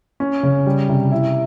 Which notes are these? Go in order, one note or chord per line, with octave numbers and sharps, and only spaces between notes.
C#4
C#3
G3
C3
E4